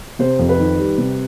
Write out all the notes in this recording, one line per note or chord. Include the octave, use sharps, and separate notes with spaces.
C3 C5
F2
B4
D#3
G3
C3